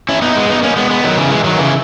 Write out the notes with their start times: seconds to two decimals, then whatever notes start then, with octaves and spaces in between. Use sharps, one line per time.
0.09 C#4 E4
0.22 B3 D#4
0.35 G#3 B3
0.49 B3 D#4
0.63 A#3 C#4
0.76 G#3 B3
0.90 G#3 B3
1.03 D#3 F#3
1.17 C#3 E3
1.31 E3 G#3
1.44 D#3 F#3
1.58 C#3 E3